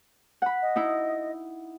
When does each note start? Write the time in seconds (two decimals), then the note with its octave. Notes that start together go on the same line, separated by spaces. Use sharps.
0.42 F#5 B5
0.62 D#5
0.76 D#4 E4